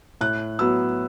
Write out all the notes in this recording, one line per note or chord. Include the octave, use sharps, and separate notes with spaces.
A2 F#6
F#3 B3 E6